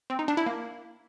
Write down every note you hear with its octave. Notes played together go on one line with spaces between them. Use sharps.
C4
D#4
D4
E4
A#3